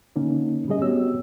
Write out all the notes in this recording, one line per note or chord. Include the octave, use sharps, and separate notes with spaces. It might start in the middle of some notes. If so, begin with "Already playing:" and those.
D3 A#3 C#4 D#4
F#3 G3 A3 C#4 G#4 D#5
B3 C4 F#4 G4 C#5 E6